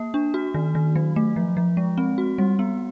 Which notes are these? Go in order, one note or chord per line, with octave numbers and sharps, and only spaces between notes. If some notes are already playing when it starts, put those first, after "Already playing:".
Already playing: A#3
D4
F#4
D#3
D#3
F#3
A3
F3
F3
G#3
C4
F#4
G3
B3